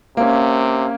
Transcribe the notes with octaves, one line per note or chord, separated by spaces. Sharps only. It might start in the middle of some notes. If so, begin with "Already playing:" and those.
C3 A#3 C#4